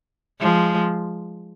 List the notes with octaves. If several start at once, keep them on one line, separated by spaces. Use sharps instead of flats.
F3 G#3